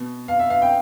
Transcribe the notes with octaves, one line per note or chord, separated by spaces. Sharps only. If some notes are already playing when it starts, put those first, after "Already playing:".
Already playing: B2
F5
E5
F5
G5